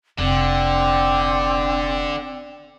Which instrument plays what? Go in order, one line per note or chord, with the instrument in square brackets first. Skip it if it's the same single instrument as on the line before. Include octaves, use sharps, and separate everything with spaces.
[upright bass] F1 [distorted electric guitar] D3 [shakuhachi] C4